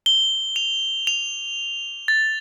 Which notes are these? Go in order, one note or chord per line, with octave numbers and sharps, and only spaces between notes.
G7
F7
F7
A6